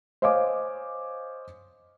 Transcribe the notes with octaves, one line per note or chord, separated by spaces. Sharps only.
C5 C#5 D#5 F5 G#5 D6